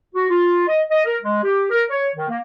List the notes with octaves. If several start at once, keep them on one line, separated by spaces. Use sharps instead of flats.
F#4
F4
D#5
D#5
A#4
G#3
G4
A#4
C#5
D#3
A#3